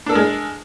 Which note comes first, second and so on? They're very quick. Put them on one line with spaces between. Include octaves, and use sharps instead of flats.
D4 A4 A#4 G#3